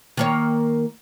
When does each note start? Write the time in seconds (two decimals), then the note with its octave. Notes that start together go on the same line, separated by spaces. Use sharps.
0.17 D#3 A#3 C#5